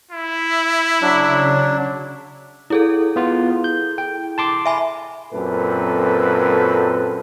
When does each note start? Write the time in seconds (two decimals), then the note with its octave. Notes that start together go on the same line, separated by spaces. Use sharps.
0.11 E4
1.02 C#3 F#3 D4
2.70 E4 G#4 A4
3.16 B3 F4
3.64 G6
3.98 G5
4.38 A5 C6 D6
4.66 E5 G#5 B5
5.33 F#2 A#2 C4 A4 B4